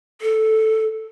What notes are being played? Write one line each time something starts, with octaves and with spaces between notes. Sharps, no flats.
A4